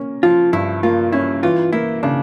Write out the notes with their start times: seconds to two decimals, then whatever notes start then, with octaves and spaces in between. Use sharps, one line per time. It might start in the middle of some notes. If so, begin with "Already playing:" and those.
Already playing: A#3 C#4
0.23 F3 F4
0.53 G2 E4
0.83 A#3 F4
1.12 C#4 E4
1.43 E3 F4
1.73 A#3 E4
2.03 C#3 D4